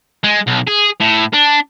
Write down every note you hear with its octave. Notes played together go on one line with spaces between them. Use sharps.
G#3
B1
G#4
A2
D4